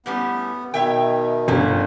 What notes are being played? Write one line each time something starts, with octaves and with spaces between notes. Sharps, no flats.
A2 G3 B3 C#4
B2 D#3 C#5 E5 G5
G1 G#2 B3 C#4